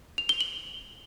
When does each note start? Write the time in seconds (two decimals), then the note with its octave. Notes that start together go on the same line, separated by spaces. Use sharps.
0.18 F7
0.29 G7
0.41 F#7